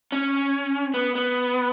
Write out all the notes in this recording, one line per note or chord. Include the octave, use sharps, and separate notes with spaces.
C#4
B3
B3